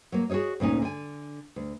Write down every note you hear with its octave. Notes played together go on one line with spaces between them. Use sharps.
F#3 A#3
F#4 G#4 A4 C#5 D#5
D2 A#2 C#4 D#4 G#5
D3 G#5
D2